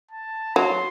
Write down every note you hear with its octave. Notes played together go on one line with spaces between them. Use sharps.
A5
F#3 C6